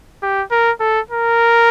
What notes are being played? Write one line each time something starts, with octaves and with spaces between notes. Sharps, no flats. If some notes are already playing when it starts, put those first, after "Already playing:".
G4
A#4
A4
A#4